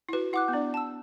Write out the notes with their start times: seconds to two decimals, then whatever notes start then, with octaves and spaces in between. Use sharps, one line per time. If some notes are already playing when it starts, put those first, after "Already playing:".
0.09 E4
0.13 F#4 B4
0.33 E4 F#5 D6 F#6
0.48 B3
0.53 D4 D5
0.74 A5 E6